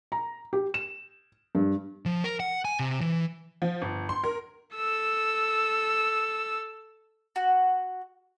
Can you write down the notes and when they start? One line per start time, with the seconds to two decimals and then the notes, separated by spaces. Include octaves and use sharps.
0.12 A#5
0.53 G4
0.74 E7
1.55 G2
2.06 F3
2.24 A#4
2.40 F#5
2.65 G#5
2.79 C3
3.01 E3
3.62 F3
3.82 G1
4.09 C6
4.24 A#4
4.76 A4 E6
7.36 F#4